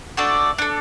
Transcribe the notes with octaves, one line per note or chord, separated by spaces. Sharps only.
A3 D4 F#4 A4 D5
D4 A4